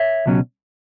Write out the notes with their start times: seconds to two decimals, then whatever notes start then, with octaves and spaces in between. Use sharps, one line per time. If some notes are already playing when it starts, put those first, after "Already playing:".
Already playing: C#5 E5
0.26 C#2 B2 F#3 C#4